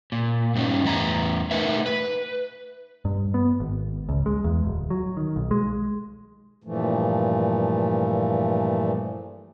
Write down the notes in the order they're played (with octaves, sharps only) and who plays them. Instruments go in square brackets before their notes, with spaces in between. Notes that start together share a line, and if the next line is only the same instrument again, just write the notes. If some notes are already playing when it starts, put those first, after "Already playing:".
[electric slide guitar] A#2
G2 A3 B3 C#4 D#4
E2 A2 E4 A#5
A3 D#4 A#4 B4 E5
B4
[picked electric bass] G2
B3
G#1
C#2
G#3
E2
D1
F#3
D#3
B1
G#3
[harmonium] G2 A#2 E3 F3 A3